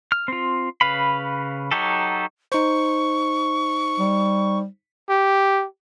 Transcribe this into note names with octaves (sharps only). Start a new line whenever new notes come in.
F6
C4 F4
C#3 B4 F5 B5
F#3 D#4 F#4 G4 A4
D#4 C5 C#6
G3
G4